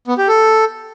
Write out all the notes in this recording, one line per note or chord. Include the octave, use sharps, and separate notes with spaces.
B3
G4
A4